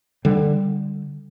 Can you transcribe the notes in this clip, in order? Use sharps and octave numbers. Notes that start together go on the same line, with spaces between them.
D3 G3